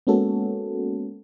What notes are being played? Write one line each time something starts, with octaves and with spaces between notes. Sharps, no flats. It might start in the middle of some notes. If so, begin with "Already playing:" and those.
G#3 A#3 B3 C#4 F#4 A4